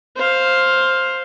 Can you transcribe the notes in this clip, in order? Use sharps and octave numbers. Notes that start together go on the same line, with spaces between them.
C5 F5